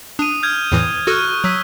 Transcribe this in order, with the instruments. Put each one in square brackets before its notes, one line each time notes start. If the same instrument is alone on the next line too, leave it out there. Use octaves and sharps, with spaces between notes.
[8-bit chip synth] D4 [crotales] D#6 D#7
[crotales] F6 G6 G#6
[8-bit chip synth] E2 A2 E3
[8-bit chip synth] F#4 A4 [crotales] C#6 F6 F#6
[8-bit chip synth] F#3 [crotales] E6 B6